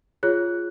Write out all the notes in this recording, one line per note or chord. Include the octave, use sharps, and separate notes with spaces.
F4 G#4 C#5 F#6